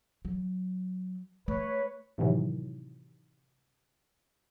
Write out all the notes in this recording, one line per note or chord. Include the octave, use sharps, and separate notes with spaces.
F#3
A3 B4 C#5
A2 C3 D#3 E3 F#3